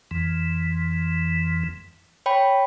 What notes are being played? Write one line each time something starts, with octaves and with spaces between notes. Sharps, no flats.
F2 E3
C#5 G5 B5